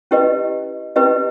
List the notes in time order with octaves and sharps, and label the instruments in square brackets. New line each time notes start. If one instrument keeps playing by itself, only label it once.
[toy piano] C#4 E4 G4 B4 D#5
C#4 E4 G4 B4 D#5